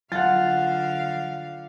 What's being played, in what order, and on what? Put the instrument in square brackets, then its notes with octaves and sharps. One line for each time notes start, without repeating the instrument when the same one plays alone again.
[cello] D3 F5 [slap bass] F#3 [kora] F4 [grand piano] F#5 A6